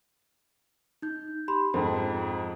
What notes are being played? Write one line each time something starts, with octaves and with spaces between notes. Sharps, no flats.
D#4 G6
G4 B5 C6
F2 G#2 C5 G5